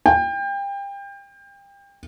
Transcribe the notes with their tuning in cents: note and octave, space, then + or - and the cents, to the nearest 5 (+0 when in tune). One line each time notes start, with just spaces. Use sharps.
G5 +30